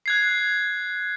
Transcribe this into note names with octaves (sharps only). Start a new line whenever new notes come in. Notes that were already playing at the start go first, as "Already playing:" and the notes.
F#6 G#6 C7